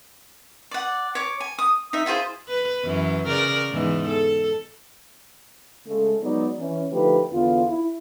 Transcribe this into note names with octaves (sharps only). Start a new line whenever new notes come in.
D5 F#5
C#5 D6
G#5
D#6
D#4 E5
E4 F4 G#4 C5
B4
F#2 E3
C#3 A#4 D5
E2 G#2 E3
A4
C#3 G#3 A3
F#3 G#3 B3 D#4 D5
E3 C#4
D3 F3 A3 D#4 G4 B4
E2 D3 B3 F4
E4